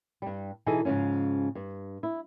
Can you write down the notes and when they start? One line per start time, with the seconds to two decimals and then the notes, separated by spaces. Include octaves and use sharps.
0.22 G2 G3
0.66 B2 E3 D#4 G#4 A4
0.85 G#2 C#3 E3 F3 C#4
1.55 G2
2.03 E4